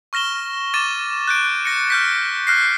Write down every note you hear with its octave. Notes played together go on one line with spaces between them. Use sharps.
C#6 F6 A#6 E7 G7
D6 A6 D#7 E7
F#6 G6 D7
A#6 C#7
F6 G6 B6
F6 F#6 A#6 C7